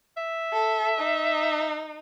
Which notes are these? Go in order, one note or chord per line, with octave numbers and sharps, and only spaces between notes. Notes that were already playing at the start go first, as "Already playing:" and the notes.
E5
A4
D#4